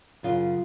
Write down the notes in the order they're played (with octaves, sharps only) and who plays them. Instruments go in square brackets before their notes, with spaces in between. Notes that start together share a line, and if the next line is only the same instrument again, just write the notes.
[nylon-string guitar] F#2 C#3 F4